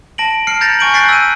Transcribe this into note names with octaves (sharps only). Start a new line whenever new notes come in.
A5 A#6 D7 F#7
F6 C7 C#7
A#5 G6 A6 A#6 C#7 E7
G#5 C#6 D7 F#7
F#6 G6 A6 B6 C7
E6 D#7